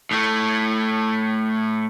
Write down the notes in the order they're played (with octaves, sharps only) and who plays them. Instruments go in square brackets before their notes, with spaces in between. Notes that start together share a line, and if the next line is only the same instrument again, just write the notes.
[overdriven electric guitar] A2 A3